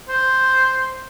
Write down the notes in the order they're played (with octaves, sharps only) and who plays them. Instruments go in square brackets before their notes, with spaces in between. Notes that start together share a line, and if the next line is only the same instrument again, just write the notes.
[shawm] C5